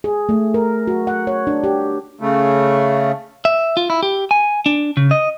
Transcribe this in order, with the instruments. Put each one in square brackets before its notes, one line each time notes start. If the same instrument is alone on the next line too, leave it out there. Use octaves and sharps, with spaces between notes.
[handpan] G#4
A3
A#4
F#4
F#5
C#5
D4
G4
[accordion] C#3 A3
[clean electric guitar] E5
F4
E4
G4
G#5
D4
C#3
D#5